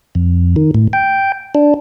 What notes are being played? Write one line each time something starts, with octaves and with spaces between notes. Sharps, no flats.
F2
D#3
A2
G5
D4